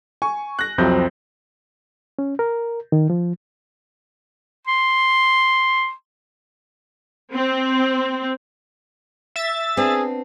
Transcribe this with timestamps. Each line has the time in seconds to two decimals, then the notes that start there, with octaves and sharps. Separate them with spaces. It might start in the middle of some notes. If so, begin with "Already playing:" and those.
0.22 G#5 C#6
0.59 F#6 A#6
0.78 C2 F2 F#3 C4 G6
2.19 C#4
2.39 A#4
2.92 D#3
3.10 F3
4.67 C6
7.34 C4
9.36 E5 A6
9.77 B3 C4 D4 G#4